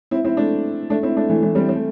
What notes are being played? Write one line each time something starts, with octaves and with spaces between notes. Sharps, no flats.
C4 E4
C4 E4
A3 D4
A3 D4
C4 E4
A3 D4
E3 A3
E3 A3
G3 C4
C4
A3